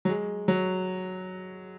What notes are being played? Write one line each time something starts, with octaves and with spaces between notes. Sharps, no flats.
F#3
G#3
F#3